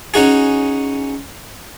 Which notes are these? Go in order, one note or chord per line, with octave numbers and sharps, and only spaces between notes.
C#4 D#4 F#4 G#4